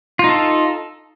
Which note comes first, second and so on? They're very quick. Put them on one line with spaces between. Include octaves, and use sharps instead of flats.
F4 D#4 A4